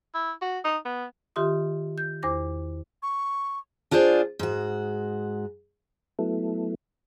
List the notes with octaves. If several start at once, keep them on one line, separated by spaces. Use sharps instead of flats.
E4
F#4
D#4
B3
D#3 F4 G4 E5 C6 D#6
G6
E2 C5 D6 A#6
C#6
D4 F4 G#4 C5 D5
G#2 F#4
F#3 A3 B3 E4 A4